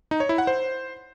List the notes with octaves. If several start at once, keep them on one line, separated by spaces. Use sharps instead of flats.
D#4
C#5
E4
F#5
C5